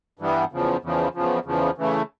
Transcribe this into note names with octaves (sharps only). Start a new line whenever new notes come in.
G2 E3 G3 B3
E2 C#3 F3
E2 C#3 F3
E2 C#3 F3
E2 C#3 F3
C#3 E3 A3